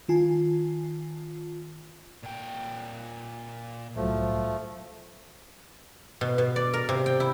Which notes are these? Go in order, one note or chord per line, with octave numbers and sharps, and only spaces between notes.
D#3 F4 G#5 A5
A#2 G5
C2 A2 F3 F#3 A3
B2
B2
D5
A#4
C3
G5
E4